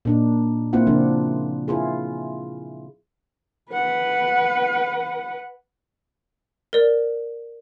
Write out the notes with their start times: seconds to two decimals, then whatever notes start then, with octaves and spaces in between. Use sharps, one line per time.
0.05 A#2 D4 D#4
0.73 A#3 C4 E4 F4 F#5
0.87 C#3 F3 D4
1.68 E4 F4 G#4
3.72 B4 F#5
6.73 A#4 D5